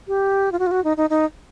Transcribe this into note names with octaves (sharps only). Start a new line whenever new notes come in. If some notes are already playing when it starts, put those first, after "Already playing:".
G4
F4
F#4
F4
F#4
D#4
D#4
D#4